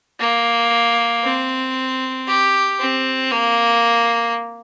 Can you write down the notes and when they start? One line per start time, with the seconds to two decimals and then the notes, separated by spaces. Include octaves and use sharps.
0.19 A#3
1.23 C4
2.27 G4
2.80 C4
3.31 A#3